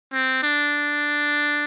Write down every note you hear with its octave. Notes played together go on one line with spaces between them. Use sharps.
C4
D4